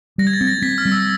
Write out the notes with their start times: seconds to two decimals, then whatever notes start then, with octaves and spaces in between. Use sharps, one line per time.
0.18 G3 A#6
0.27 G#6
0.33 A6
0.41 C4
0.47 A#6
0.62 C4 B6
0.78 F6
0.85 G3
0.92 E6